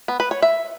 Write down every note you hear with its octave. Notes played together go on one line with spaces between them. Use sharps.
B3
B4
C#5
E5